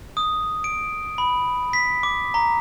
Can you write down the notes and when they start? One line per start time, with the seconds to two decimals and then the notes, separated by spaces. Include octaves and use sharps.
0.17 D#6
0.64 D7
1.18 B5
1.73 B6
2.03 D6
2.34 A#5